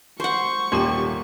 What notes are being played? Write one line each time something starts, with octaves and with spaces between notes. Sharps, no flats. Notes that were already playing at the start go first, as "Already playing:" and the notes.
C5 F#5 C#6
D#1 A#2 C#4 G4 G5 C6